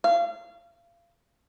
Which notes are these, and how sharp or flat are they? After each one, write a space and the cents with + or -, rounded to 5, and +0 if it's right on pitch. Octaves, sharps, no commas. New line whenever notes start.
F5 -30